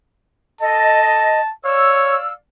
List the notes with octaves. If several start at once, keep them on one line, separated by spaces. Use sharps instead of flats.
A4 D#5 A5
C#5 D5 F5 E6